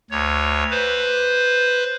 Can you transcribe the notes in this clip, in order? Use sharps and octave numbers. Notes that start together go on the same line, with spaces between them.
D2 C#5
B4 C5